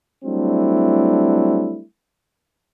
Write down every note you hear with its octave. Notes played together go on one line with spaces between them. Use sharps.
F#3 G3 A3 C4 D4 E4